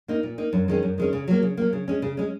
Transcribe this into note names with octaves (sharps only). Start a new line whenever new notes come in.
A#3 D#4
A#2
A#3 D#4
F#2
D#3 G#3 C#4
F#2
D#3 G#3 C#4
C#3
F#3 A#3
C#3
F#3 A#3
C#3
G#3 C#4
C#3
G#3 C#4